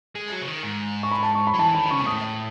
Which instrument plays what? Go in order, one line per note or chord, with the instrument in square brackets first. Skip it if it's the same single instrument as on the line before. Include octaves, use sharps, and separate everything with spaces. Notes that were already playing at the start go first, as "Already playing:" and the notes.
[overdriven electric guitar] G#3
F#3
C#3
D#3
G#2
[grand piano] C#6
B5
A5
C#6
B5
[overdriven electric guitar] F#3
[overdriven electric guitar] E3 [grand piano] A5
[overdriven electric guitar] D#3 [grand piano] B5
[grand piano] B5
[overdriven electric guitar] C#3 [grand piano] C#6
[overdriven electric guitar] B2
[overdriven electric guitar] A2 [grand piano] D#6